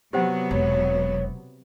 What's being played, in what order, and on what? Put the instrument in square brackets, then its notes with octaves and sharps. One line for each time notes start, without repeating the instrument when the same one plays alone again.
[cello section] C3 F#3 B3 [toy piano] G4 C5 F#5
[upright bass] E1 [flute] C#5